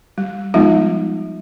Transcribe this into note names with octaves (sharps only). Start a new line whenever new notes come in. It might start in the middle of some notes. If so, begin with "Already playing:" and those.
G3
F3 G3 G#3 B3 D#4 F4